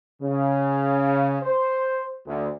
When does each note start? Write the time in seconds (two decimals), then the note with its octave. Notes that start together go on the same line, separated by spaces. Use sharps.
0.22 C#3
1.43 C5
2.26 D2